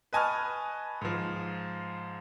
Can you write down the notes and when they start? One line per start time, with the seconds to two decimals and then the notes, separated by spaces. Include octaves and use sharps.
0.13 B4 D#5 G#5 A5 C#6 F6
1.01 G#2 F3